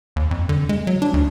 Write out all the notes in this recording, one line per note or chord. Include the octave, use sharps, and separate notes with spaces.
D#2
F2
D3
G#3
F#3
D4
D2